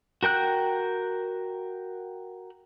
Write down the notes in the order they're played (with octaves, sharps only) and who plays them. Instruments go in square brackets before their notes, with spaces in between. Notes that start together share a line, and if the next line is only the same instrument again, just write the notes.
[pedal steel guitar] F#4 A#4 G5 F#6